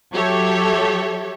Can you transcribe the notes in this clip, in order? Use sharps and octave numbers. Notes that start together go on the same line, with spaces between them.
F#3 G4 A4 C#5 E5